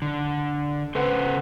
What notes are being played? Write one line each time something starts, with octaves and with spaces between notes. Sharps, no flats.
D3
C#3 C#4 A4 B4 C5 F#5